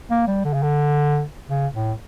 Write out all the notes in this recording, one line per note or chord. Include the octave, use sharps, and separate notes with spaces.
A#3
G3
D3
C#3
D3
C#3
A2